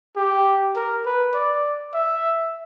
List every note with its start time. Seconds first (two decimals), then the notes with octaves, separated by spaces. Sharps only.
0.16 G4
0.76 A#4
1.05 B4
1.34 D5
1.94 E5